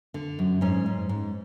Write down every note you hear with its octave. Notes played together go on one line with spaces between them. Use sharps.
D3
F#2
G#2 C#4
G#2
G#2